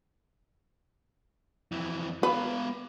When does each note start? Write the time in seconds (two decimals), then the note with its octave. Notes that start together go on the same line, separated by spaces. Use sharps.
1.72 F2 E3
2.23 B3 B4 F5